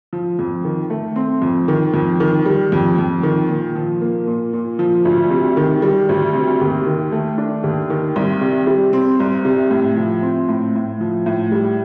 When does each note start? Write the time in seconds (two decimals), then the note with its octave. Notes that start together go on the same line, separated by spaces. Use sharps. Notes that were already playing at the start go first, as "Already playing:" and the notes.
0.13 F3
0.39 F2
0.64 D#3
0.90 A3
1.16 C4
1.42 F2
1.68 D#3
1.94 F2
2.20 D#3
2.46 G3
2.72 F2
2.98 F2
3.23 D#3
3.49 A#2
3.75 F3
4.01 A#3
4.27 A#2
4.53 A#2
4.79 F3
5.05 D2
5.30 C3
5.57 D#3
5.82 G3
6.09 D2
6.34 C3
6.61 D#2
6.86 D#3
7.12 A3
7.38 D4
7.63 D#2
7.90 D#3
8.16 C2
8.41 C3
8.67 G3
8.93 C4
9.20 C2
9.45 C3
9.70 A2
9.96 F3
10.22 C4
10.49 A2
10.75 A2
11.01 F3
11.26 A2
11.52 G3